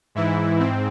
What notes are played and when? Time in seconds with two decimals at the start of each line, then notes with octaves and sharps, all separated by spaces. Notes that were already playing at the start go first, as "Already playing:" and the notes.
0.15 G#2 E3 E4
0.58 G#2 C4